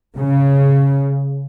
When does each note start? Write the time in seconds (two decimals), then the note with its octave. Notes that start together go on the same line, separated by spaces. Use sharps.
0.17 C#3